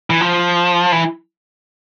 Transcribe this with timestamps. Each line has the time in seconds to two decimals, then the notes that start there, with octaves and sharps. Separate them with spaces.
0.10 E3
0.21 F3
0.92 E3